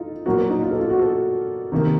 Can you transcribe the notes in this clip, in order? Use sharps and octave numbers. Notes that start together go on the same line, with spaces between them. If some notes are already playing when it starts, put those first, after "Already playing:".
Already playing: D#4 F4 A4
A#2 F#3 A#3 F#4
A#4
D#4
F4
A4
F4
F#4
A4
C3 D#3 A#3